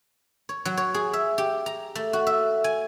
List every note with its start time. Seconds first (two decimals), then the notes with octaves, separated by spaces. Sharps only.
0.49 C#5
0.65 F#3
0.77 C#5
0.94 G#4
1.13 E5
1.38 G4
1.66 A#5
1.95 A3
2.13 F#4
2.27 E5
2.64 G#5